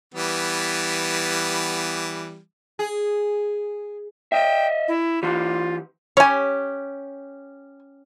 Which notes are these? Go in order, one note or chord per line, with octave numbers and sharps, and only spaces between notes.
E3 G3 B3
G#4
D#5 E5 G5
E4
E3 F4 G4
C#4 G4 C#5 G#5